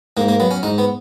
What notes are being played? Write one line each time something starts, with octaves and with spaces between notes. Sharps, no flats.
G#2 A#3
A#3
F#3 B3
C#4
G#2 D#4
B3